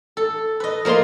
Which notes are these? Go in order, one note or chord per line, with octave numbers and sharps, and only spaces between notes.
A4
B4 D#5
F3 A#3 D#5 A#5 C6